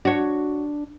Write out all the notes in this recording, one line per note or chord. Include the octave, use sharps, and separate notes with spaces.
D4 F#4 C#5